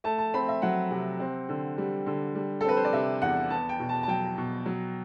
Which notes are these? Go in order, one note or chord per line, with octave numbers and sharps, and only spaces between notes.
A3 A5
A5
C4 B5
E5
F#3 F#5
C3
C4
D3
G3
D3
G3
A4
C4 B4
C5
D5
C3 E5
E2 F#5
B3 A5
G5
B2
A5
A5
F#3 G5
B2
F#3